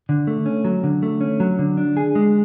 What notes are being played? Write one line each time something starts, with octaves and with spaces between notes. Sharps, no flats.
D3
A3
C#4
F#3
D3
A3
C#4
F#3
D3
D4
G#4
G#3